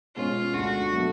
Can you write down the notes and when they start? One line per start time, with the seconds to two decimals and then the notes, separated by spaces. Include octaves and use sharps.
0.16 B2 G#3 C#4 F4
0.53 D2 D3 G#3 D4 F#4
0.93 B2 F#3 A3